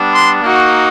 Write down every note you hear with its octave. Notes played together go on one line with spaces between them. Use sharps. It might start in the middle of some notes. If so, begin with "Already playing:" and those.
Already playing: G3 B3 D4
C6
A#3 D#4 F#4